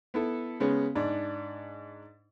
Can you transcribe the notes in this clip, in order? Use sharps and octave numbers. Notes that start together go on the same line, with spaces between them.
B3 E4 A4
C#3 G#3 B3 C#4
G#2 D4